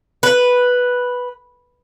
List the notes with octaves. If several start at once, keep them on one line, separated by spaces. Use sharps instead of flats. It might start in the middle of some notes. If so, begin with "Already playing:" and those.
B4